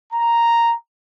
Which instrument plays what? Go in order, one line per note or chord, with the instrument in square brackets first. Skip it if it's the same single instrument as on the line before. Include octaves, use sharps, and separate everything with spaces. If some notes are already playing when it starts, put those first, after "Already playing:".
[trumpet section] A#5